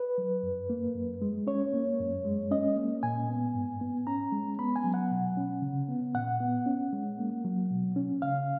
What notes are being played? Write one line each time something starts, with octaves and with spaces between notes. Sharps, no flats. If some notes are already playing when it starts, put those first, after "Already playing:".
Already playing: B4
F#3
F#2
A#3
F#2
G#3
C#4 C#5
A#3
F#2
G#3
C#4 D#5
A#3
A#2 G#5
B3
G#2
B3
C#4 A#5
G#3
B3 B5
G#5
F#3
F#5
B2
C#4
C#3
B3
A#2 F#5
B3
C#4
G#3
A#3
F#3
B2
C#4
C#3 F5